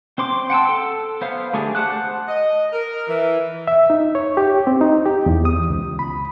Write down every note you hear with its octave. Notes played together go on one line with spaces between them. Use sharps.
C4 C5 C6 D6
F#5 G5 A5 E6
A4
B3 C5 F5
D3 A3 G4 G#4 D5
C5 F#5 A5 D6 F#6
D#5
A#4
E3
E5
D#4
C#5
G4
C4
D#4
G4
E2
D#6
C#2
B5